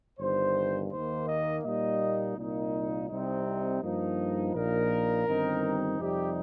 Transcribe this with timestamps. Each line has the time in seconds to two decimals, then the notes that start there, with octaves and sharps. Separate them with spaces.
0.19 G1 G2 D#3 C5
0.92 D#2 D#3 A#3 C5
1.28 D#5
1.64 A#2 G3 A#3 D#4 D#5
2.37 C2 A#2 A#3 D#4
3.09 C2 C3 G3 C4 D#4
3.82 G2 F3 A#3 D#4
4.54 A#1 A#2 A#3 D#4 A#4
5.27 G1 G2 D#3 C4 D#4
5.99 F2 C3 G3 D#4 G4